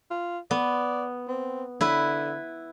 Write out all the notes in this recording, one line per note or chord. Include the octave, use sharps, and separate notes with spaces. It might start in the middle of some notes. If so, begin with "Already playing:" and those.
F4
B3 D5
C4
D3 E4 B4